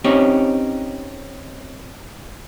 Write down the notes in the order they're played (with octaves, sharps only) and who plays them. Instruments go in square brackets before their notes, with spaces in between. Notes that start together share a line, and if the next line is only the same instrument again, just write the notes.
[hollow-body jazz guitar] C4 C#4 D#4 G4 C#5